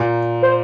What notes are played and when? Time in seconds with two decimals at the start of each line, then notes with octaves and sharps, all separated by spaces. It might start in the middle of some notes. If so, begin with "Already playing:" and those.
Already playing: A#2
0.42 C5